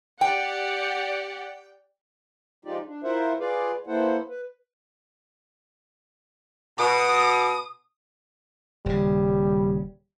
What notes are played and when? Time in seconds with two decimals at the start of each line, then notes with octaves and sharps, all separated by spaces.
0.21 G4 D5 F#5 G5
2.65 F3 G#3 D#4 F4 G4 D5
2.86 D4
3.04 E4 F4 A#4 C5 E5 F#5
3.40 F4 G#4 B4 D5 F5
3.87 A#3 B3 E4 A4 C5 F#5
4.29 B4
6.78 B2 D#6
8.86 D#1 C#3 G3